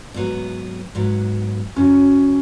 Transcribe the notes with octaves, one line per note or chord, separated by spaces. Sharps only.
G#2 F#3 B3
G#2 F#3 B3
F#2 C#3 F#3 C#4